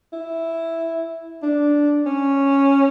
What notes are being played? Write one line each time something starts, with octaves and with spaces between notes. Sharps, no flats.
E4
D4
C#4